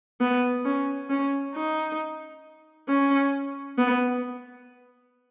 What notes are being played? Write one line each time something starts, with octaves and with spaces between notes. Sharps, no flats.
B3
C#4
C#4
D#4
C#4
B3